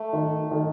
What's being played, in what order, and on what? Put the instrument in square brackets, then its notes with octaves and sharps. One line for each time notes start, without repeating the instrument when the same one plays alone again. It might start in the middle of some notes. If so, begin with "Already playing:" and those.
Already playing: [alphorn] A3
[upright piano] D#3
D#3